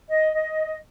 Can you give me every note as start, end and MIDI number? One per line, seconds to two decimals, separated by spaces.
0.09 0.32 75
0.33 0.75 75